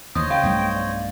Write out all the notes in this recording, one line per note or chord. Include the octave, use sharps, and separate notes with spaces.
D#2 C5 C#5 D#5 D#6
C#3 F5 G5
B1 G2 A3
D5
D5